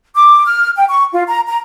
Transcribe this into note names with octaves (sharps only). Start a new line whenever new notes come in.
D6
F6
G5
C#6
F4
A#5
A#5